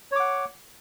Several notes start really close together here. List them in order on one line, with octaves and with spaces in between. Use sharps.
C#5 D6 F#5